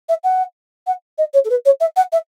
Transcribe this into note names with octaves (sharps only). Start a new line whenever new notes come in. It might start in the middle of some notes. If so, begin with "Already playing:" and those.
E5
F#5
F#5
D#5
C#5
A4
B4
C#5
E5
F#5
E5